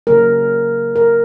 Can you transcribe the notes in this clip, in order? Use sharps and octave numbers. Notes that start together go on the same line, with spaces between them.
C#3 F#3 A#3 A#4
A#4